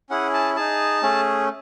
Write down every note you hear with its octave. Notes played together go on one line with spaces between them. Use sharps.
C#4 E4 G#4 F#5
A5
D#4 G#4 A5
A3 C#4 G#4